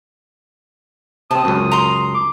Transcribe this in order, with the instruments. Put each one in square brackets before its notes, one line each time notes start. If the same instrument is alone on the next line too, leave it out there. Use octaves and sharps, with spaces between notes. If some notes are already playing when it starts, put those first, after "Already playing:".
[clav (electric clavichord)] C3 C4 [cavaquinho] A5 [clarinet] D#6
[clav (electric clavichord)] C#2 F#2
[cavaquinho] A#5 C6
[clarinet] D6